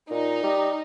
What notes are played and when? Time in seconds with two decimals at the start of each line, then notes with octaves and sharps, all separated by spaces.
0.10 A#2 D#4
0.43 G3